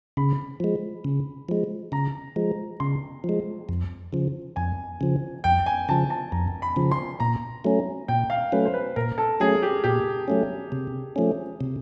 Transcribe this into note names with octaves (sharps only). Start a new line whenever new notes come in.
C#3 B5
F3 G#3
C#3
F3 G#3
C#3 A#5
F3 G#3
C#3 C6
F3
G#3
F2
C#3 F3
F2 G#5
C#3 F3
F2 G5
G#5
C#3 F3 A5
A5
F2 A#5
B5
C#3 F3
C6
A#2 A#5
F#3 A3 C#4
A#2 G5
F5
F#3 A3 C#4 B4
C5
B4
A#2 A#4
A4
F#3 A3 C#4 G#4
G4
A#2 G4
F#3 A3 C#4
C3
F3 A3 C#4
C3